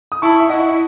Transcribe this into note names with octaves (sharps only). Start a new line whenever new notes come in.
D#6
E4 A5 C#6
E5
E4 D#5 F#5